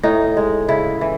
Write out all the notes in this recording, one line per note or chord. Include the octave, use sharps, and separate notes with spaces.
A2 D#4
G#3
C#3 E4
E3